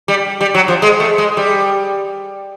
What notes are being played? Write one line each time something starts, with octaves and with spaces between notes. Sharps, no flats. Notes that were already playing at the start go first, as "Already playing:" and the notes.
G3
G3
F#3
F3
G#3
A3
G#3
G3